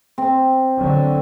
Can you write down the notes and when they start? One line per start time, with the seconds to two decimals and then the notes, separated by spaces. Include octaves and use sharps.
0.18 C4
0.77 D3 F#3